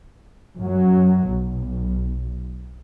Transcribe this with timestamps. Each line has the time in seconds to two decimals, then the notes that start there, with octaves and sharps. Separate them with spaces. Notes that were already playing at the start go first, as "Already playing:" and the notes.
0.58 F#2 F#3
1.28 B1